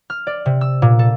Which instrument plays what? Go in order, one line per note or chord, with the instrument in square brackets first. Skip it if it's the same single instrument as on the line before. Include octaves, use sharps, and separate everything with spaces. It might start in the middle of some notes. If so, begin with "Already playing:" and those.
[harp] F6
D5
C3
E6
A#2
A4